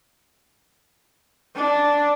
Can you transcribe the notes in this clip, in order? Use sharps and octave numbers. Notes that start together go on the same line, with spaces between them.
D4